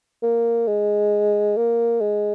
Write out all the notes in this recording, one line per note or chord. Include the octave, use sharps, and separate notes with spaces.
A#3
G#3
A#3
G#3